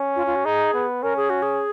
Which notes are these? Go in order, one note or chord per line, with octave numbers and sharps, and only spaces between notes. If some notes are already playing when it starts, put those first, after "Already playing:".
Already playing: C#4
F4
F4
F#4
D#4 G#4
B3
C#4 A#4
G#4
F#4
G#4